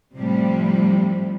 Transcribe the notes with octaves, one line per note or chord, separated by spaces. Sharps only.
A2 C3 F3 G3